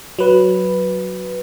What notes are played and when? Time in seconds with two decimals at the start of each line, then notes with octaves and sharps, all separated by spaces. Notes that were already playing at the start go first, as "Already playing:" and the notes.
0.19 F#3 B4